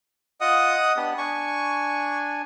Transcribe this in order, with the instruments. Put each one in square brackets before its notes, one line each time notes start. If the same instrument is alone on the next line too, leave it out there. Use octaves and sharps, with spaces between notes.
[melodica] F4 [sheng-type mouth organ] D#5 F#5 D#6
[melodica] B3 D4 G4
[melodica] D4 G#5 [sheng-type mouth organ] C#6